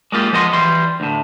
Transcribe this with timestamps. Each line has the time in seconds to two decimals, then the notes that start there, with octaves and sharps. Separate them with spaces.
0.12 G#3 A#3 F4 G4
0.32 F3 G#3 B3 D#5 E5 C6
0.53 E3 G3 C6
1.00 D2 A2